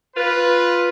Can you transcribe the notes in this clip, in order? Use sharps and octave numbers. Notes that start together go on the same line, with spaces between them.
F4 B4